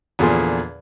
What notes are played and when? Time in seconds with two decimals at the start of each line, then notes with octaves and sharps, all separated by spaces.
0.19 E2 A#2 D3 F3 G#4 C6